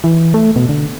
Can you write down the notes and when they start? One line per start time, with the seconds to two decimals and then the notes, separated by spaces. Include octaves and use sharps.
0.04 E3
0.34 A3
0.56 B2
0.69 D3